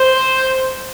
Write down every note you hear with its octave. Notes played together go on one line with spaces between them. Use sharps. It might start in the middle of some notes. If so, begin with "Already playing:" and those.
Already playing: C5